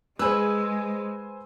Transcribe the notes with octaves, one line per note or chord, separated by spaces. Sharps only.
G#3 G#4 B4 C5 G#5 E6